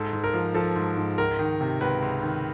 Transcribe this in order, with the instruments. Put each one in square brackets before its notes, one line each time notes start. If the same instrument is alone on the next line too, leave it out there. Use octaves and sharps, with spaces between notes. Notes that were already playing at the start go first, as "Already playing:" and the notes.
Already playing: [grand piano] G#2 A4
G#2
A#4
F3
F3 A4
G#2
G#2
C#2 A#4
D#3
C3
C#2 B4
C#2
D#3